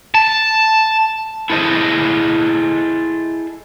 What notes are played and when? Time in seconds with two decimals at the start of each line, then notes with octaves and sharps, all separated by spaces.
0.15 A5
1.50 E4 G#4 A4 C5 D#5